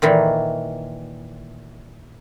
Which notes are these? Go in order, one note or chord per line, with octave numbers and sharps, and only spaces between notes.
A#2 D#3 E3